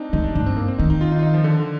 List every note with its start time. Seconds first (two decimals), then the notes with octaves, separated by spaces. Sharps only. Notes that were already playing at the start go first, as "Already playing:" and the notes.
Already playing: C4 D4 D#4
0.13 D3 D#4
0.24 D4
0.35 G2 D4
0.46 C4
0.57 A#3
0.68 C4
0.78 D#3 D#4
0.90 D#4
1.01 F4
1.12 D#4
1.19 F4
1.23 D#4
1.34 F3
1.44 D3